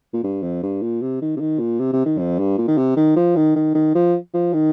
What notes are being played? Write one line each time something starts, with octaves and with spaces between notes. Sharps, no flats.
A#2
G2
F2
G2
A#2
C3
D#3
C3
D#3
A#2
C3
C3
D#3
F2
G2
A#2
D#3
C3
D#3
F3
D#3
D#3
D#3
F3
F3
D#3